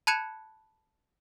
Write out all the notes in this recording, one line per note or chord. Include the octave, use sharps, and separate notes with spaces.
A5 B5 F#6 G#6 C#7 E7